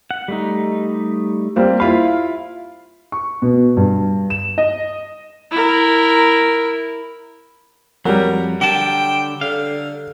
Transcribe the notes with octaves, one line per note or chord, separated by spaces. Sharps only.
F#5
G3 A3 D#4
G3 A#3 C4
E4 F4 F5 B5
C#6
B2
G2
E7
D#5
E4 A#4
F2 F#3 G3 A#4
D3 G5 A5
D3 F5